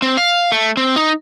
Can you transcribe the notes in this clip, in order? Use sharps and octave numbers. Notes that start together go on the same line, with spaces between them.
C4
F5
A3
C4
D#4